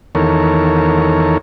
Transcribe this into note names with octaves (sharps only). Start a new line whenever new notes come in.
E2 D#3 A4 A#4 C#5